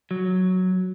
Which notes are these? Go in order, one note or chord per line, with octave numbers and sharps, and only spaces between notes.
F#3